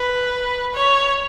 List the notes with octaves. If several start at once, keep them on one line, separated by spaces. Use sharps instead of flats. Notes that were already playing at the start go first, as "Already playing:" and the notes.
Already playing: B4
C#5